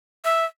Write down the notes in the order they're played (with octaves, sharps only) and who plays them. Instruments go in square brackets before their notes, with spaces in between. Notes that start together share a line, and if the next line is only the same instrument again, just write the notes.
[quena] E5